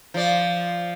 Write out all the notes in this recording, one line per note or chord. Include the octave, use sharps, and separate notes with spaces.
F3 D5